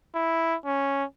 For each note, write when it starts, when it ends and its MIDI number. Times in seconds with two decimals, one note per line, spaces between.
0.15 0.55 64
0.66 1.04 61